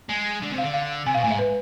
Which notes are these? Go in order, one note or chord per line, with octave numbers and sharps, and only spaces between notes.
G#3
D3
C3
F5
D3
F5
C3 G#5
F5
B2
A2 G#5
G#2 E5
B4